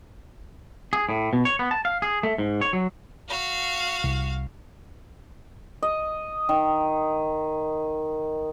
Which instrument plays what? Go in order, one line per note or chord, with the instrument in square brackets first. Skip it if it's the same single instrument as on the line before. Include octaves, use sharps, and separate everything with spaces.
[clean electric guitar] G#4
A2
B2
C#5
B3
A5
F5
G#4
A3
G#2
C#5
F#3
[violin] F#4 F5
[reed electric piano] C2
[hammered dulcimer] D#5
D#3